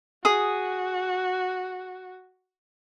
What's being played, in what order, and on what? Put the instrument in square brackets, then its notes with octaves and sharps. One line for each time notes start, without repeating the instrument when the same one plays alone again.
[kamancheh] F#4 [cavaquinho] G#4 D#6